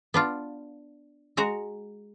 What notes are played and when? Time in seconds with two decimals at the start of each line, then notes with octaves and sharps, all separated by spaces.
0.14 B3 D4 F4
1.37 G#3 F#4 A#5